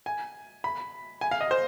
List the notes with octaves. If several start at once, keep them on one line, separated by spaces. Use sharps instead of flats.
G#5
B5
G#5
F5
D#5
C5